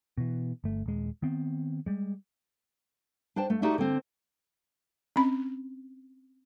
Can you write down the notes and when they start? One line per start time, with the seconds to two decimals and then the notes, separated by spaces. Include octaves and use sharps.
0.18 B2 E3
0.64 G1 A3
0.86 D#1 G#3
1.22 D#3 B3 C4
1.86 G3 G#3
3.36 D4 C5 G5 A5
3.50 A3
3.62 A3 D#4 F#4 G4 D5 E5
3.78 D3 C4
5.16 C4 C#4 B5